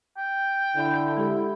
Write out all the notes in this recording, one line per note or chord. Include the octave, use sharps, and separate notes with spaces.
G5
D3 E4
G#3 G4 A4